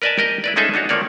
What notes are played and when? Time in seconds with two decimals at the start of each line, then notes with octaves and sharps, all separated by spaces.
0.02 A#4 B4 D5 D#5 G#5 A5
0.18 G4 A#4 D#5 G5
0.44 E4 B4 D5
0.56 G#3 C#4 D#4 G#4 A4 E5
0.74 D4 D#4 F#4 C#5
0.89 D#3 F3 A3 A#3 C#5 D5